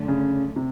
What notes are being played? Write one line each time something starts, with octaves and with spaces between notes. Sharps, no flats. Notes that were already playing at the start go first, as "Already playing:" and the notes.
Already playing: F#2 D3 F#3 A3 C#4
C#3
C3